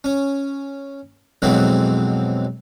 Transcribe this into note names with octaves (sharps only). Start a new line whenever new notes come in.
C#4
F2 B2 E3 F#3 G#3 C4